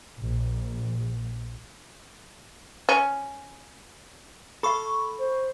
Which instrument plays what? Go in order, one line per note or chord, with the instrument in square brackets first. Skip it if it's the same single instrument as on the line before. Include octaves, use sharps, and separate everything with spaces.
[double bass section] A#1
[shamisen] C#4
[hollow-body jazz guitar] A4 F5 [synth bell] B5 C#6
[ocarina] C5